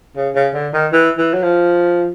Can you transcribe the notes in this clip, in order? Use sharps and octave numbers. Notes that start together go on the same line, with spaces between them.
C#3
C#3
D3
D#3
E3
E3
F#3
F3